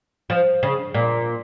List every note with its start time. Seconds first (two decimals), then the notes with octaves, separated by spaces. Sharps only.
0.30 F3
0.63 C#3
0.94 A#2